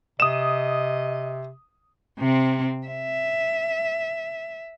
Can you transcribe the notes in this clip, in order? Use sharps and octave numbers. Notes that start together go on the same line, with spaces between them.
C3 D#5 D#6 E7
C3 C4
E5